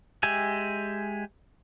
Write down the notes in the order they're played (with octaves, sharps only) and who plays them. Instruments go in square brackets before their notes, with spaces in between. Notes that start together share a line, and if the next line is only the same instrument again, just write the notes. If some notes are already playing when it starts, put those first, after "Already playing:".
[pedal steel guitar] G#3 G4 E5 G#5